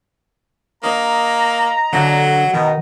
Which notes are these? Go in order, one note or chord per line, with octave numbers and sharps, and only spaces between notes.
A#3 D#5 A#5
D3 F#3 F#5
B2 D#3 D#4